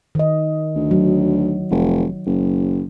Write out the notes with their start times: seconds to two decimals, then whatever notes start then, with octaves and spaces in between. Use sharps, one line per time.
0.15 D#3 D#5
0.75 D2
0.91 F#3
1.71 F1
2.27 F#1